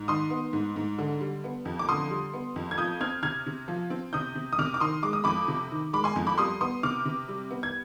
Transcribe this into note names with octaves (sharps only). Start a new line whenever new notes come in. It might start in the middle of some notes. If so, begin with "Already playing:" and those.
Already playing: G#2
D#3 C6 D#6
B3
G#2
G#2
D3
G3
B3
F2
D6
D3 C6 D#6
G3
B3
F2
G#6
F3 D#6 G6
C4 F6 G#6
C3 F6 G#6
C3
F3
C4
C3 D#6 G6
C3
D#6
C3 D6 F6
D6
D#3 C6 D#6
G#3 D6
D#6
F2 B5 D6
C3
D#3
G#3 B5 D6
G#5 C6
F2
B5 D6
G3 C6 D#6
B3 C6 D#6
C3 D6 F6
C3
G3
B3
G#6